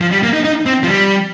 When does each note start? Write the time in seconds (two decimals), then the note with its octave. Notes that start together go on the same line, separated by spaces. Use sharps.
0.01 F3
0.12 G3
0.23 A#3
0.34 D#4
0.44 D#4
0.66 C4
0.83 F3
0.87 G3